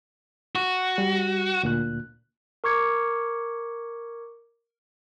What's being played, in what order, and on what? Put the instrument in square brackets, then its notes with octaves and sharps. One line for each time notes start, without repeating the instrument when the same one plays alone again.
[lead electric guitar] F#4 [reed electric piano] C#6
[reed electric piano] G3
D2 A#2 F#6
[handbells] A#4 C#6 D6 G#6 C#7